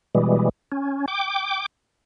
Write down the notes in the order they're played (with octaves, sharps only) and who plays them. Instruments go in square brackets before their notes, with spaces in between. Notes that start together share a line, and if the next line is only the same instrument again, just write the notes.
[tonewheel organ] B2 E3 G3 G#3
C#4
G5 D6